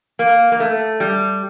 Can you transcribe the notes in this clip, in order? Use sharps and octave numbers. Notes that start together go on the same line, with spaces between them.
A#3
A#3
A3
G3